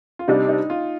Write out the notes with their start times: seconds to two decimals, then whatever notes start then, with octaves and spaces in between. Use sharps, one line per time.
0.19 F4
0.28 C3 G3 D4 D#4
0.49 D#4
0.70 F4